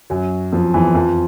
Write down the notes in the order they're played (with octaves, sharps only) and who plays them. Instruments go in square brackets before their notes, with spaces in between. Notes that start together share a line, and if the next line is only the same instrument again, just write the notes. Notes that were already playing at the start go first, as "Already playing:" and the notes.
[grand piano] F#2 F#3
F2 F3
E2 E3
F2 F3